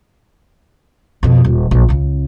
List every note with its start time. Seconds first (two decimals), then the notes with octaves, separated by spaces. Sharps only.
1.23 F2 B2
1.45 D#1
1.71 A#1
1.89 C#2 C#3